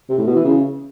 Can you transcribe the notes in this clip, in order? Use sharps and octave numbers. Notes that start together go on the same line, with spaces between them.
C3
A2
B2
E3
C#3